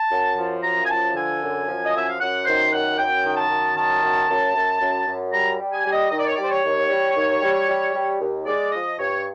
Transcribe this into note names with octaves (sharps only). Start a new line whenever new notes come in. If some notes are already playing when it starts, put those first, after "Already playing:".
Already playing: A5
F#2
F3
F#2 A#5
G#5
F3 A5
D3 G#5
F#2
F3
D#5
F#2 E5
F5
F#2 F#5
D#3 C5
F#2 F#5
F#2 G5
D#3
A5
F#2
D#3 A5
F#2
F#2
F#2
F#2
F#2
G3 A#5
G3
G#5
G3
D#5
D#3 D#5
D5
C#5
G3 D5
C5
C#5
D#2
G3
D#2
G3
G3
G3
D#2
G#3 D5
F3 D#5
G2 C#5